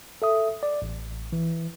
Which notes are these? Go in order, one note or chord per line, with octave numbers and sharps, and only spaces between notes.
A4 E5 D#6
D5
A1
E3